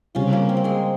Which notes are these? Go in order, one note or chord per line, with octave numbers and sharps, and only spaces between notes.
C#3 G3 C4 C#4 F4
A#3 C#4
C4
A#3
G#3 C4